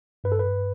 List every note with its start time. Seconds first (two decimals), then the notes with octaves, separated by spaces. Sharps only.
0.24 G2 B4
0.32 A4
0.39 B4
0.45 G2